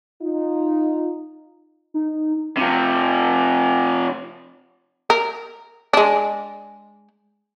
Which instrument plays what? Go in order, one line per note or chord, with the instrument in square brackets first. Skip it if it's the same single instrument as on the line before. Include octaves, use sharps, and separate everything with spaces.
[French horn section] D#4 F4
[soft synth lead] D#4
[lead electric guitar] C3 F3
[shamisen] A#4
G#3 D4